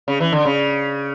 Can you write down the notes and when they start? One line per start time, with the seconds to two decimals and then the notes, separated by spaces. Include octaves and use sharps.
0.08 C#3
0.20 E3
0.32 D3
0.45 C#3